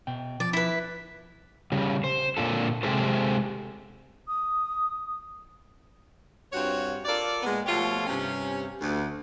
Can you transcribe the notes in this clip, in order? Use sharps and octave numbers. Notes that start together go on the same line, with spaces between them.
B2 G5
F3 D5
E4 B4
C#3 G3
C5
A#2 D3 F4 A4
C3 G#3 G4 A4 C5
D#6
G2 C4 F4 F#4 C#5
F4 A4 A#4 D5
A#2 G#3 B3
B2 F3 A3 F4 G4 C#5
G2 C3 C#4
D2